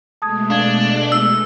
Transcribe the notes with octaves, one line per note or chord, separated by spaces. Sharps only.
B2 G#3 A3 A5 D#6 G#6
D4 F5 G#6
E6